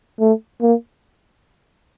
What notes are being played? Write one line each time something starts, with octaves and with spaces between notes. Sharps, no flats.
A3
A#3